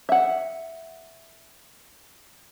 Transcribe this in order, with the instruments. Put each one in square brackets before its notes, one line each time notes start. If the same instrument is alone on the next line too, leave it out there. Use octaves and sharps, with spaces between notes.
[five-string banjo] E5 F#5